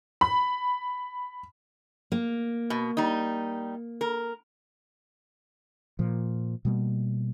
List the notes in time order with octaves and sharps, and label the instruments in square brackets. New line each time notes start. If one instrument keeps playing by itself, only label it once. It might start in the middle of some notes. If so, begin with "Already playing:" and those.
[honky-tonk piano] B5
[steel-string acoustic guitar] A#3
[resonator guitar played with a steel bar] B2
G3 D#4
A#4
[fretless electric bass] A#2 F3
B2 G3 G#3 A#3